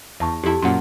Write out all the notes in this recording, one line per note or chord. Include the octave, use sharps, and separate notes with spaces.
E2 E5 A5 C#6
F2 E4 G4 A5
F#2 A#2 F#5 C6